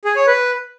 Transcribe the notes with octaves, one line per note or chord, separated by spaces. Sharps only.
G#4
C#5
B4